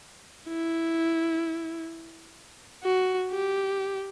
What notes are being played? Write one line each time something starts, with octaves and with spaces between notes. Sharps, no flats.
E4
F#4
G4